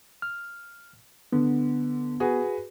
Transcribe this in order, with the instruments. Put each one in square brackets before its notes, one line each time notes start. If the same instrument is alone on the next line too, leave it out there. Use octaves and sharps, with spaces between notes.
[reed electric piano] F6
[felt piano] D3 [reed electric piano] B3
[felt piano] F#4 G#4 B4